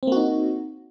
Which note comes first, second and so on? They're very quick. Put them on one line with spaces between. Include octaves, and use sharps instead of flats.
C4 A#3 F#4 D#4